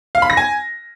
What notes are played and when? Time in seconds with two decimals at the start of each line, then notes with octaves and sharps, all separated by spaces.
0.15 F5
0.22 B5
0.30 A#6
0.37 G#5